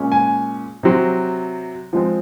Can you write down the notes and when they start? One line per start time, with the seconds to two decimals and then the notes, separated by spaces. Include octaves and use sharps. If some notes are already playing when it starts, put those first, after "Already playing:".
Already playing: A#2 G#3 C#4
0.12 G#5
0.83 C3 F#3 C4
1.93 F3 G#3 C4